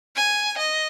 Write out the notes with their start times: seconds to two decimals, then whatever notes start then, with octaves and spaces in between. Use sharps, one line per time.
0.16 G#5
0.58 D#5